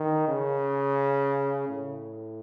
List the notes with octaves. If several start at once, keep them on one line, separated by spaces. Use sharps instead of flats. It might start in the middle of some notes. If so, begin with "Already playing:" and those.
Already playing: D#3
C#3
A2